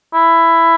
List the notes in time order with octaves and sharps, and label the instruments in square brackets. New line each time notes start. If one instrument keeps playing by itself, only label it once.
[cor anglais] E4